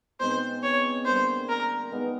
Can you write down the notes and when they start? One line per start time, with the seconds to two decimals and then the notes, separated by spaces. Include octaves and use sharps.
0.20 B2 G#3 C4 D#4 C5
0.63 C#5
1.06 D3 G3 A#3 C5
1.49 A#4
1.91 G#3 B3 D#4 G4